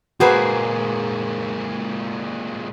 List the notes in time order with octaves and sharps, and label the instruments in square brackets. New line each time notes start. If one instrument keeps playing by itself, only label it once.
[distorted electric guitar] A#2 G#3 [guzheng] A#3 G#4 C5 [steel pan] F#4 B4